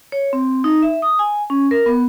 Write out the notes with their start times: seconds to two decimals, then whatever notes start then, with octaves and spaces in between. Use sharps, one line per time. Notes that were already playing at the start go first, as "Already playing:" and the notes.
0.12 C#5
0.33 C4
0.64 D#4
0.82 E5
1.02 D#6
1.19 G#5
1.50 C#4
1.71 A#4
1.86 B3